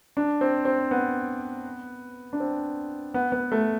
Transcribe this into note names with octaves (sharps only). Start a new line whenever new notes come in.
D4
C4
C4
B3
D4
C4
B3
B3
A3